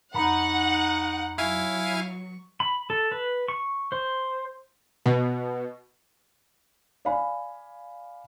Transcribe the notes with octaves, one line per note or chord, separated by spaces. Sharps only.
F2 D#4 F#5 A#5 B5 C#6
F#3 E4 F5 G#5 C#6
B5
A4
B4
C#6
C5
B2
D5 F5 G#5 B5